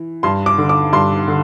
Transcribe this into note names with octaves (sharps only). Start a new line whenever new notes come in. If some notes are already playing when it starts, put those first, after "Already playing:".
Already playing: E3
G2 C6
D6
D3
D6
G2 C6
D3